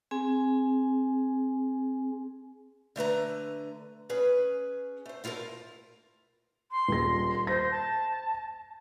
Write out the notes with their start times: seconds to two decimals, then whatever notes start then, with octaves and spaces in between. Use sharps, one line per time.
0.11 C4 G#4 G#5
2.96 D3 A3 B4 A#5
4.09 C#4 G#4 B4
5.06 A3 C5
5.24 E4 F4 G4 A4 A#4
6.71 C6
6.88 D#1 G#4 A#6
7.47 C5 A#6
7.71 A5